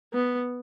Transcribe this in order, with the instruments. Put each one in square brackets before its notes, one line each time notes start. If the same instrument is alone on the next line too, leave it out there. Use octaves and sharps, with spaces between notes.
[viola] B3